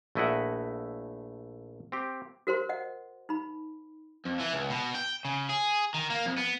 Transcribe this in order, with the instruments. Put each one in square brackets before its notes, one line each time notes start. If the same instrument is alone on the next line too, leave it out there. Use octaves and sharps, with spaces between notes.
[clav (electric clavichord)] A#1 A3 E4 D#5 E5 F#5
C4 G4
[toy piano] F#4 A#4 C5 C6
D#5 F#5
D#4 B5
[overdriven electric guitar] F2
E3
C#2
B2
G5
C#3
G#4
D#3
A#3
F2
B3